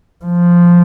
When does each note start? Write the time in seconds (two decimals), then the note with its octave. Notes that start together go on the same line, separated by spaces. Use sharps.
0.25 F3